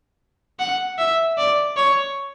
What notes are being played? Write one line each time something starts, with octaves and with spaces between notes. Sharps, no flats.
F#5
E5
D5
C#5